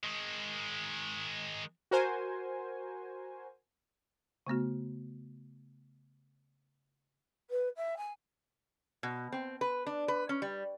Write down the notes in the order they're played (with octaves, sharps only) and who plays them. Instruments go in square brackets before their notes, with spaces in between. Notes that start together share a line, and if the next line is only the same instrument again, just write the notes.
[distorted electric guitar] D#3 G#3
[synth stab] F#4 A#4 C5 G#5
[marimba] C#3 A3 B3 F#4
[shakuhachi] B4
E5
G#5
[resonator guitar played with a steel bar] B2
C4
B4
D4
B4
C#4
G3